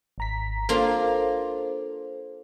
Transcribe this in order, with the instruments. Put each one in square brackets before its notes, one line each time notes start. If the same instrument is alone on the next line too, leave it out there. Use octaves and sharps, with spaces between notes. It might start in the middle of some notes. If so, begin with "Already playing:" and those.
[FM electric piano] G#1 A#5 B6
[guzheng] A#3 D4 F4 [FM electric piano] A4 C5